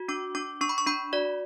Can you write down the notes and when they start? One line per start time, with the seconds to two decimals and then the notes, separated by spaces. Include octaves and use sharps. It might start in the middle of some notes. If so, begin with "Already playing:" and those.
Already playing: F#4
0.08 D4 D6
0.35 D4 D6
0.61 D4 C#6
0.69 B5
0.78 C#6
0.86 D4 B5
1.13 F#4 D5